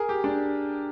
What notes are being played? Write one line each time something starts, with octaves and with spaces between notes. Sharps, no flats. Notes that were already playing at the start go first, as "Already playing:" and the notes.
Already playing: G#4 A#4
G4
D4